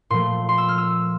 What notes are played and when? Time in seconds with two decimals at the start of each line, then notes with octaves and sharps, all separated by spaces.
0.10 A#2 F3 A3 C6
0.49 C6
0.58 E6
0.68 F6
0.78 E6